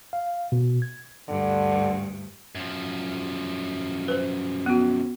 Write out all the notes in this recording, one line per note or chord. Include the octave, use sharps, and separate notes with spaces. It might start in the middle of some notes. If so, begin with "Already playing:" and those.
F5
B2
G#6
D2 G2 D3
F#2 F3
B4 C5
B3 F#4